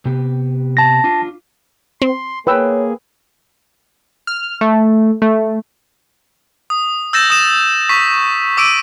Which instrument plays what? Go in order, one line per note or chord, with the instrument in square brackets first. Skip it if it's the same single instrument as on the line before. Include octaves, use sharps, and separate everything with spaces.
[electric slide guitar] C3 B3 G4
[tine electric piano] A5 A#6
[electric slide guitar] D4 F4
[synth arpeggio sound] C4 [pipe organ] C6
[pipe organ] A#3 G#4 [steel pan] B4 G5 E6 [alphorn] C#5
[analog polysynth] F6
A3
A3
[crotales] D#6
E6 G6 A6 A#6 E7
D#6 E7
C#6 B6
D6 E6 B6 D7 D#7